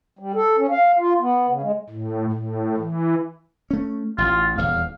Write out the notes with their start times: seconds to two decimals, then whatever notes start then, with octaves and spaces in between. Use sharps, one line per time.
0.19 G3
0.35 A4
0.58 C#4
0.70 F5
0.99 F4
1.20 B3
1.48 C#3
1.62 G#3
1.89 A2
2.32 A2
2.77 E3
3.71 A3 C#4
4.18 A1 F4
4.58 D#1 E2 F5